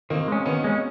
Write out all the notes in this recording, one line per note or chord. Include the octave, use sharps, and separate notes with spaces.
D#3 A#3 C4
G#3 C#4
D#3 B3 C#4
G#3 C#4